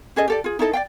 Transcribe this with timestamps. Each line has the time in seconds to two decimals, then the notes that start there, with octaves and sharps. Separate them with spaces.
0.16 C#4 G#4 A4 D#5
0.28 G4 A4 D5
0.44 F4 G#4
0.59 D#4 E4 A4 D#5
0.73 D5 F5 G5